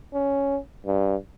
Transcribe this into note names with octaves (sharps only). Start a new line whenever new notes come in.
C#4
G2